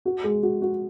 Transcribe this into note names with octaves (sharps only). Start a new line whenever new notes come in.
F#4
G#3
F#4
F#4